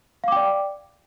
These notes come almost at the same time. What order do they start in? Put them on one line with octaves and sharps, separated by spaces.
F5 D6 G5 D5